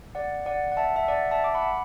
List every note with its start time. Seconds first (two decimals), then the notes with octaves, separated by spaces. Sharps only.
0.15 D5 F#5
0.46 D5 F#5
0.72 F#5
0.77 E5 A5
0.96 E5
1.08 D5 F#5
1.31 E5 A5
1.44 D6
1.54 F#5 B5